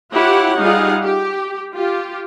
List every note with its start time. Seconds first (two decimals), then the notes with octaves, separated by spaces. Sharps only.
0.12 E4 F4 G4 C#5 F#5
0.59 G3 D#4 F4 G#4 F5 F#5
1.01 G4
1.74 F4 G4